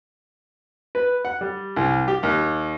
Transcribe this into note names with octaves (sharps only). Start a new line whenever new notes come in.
B4
F#5
G3
C2
G4
D#2